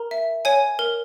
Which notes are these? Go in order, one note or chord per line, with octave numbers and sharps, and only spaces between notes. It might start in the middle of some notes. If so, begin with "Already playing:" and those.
Already playing: A#4 A#5
E5
C#5 G#5
A#4